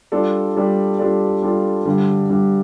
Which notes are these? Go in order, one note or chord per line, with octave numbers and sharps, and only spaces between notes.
G3 D4 F4 A4 D5
G3 D4 F4 A4 D5
G3 D4 F4 A4 D5
G3 D4 F4 A4 D5
G2 D3 G3
G2 D3 G3